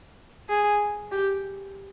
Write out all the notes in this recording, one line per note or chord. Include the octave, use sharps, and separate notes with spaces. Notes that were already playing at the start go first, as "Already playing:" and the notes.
G#4
G4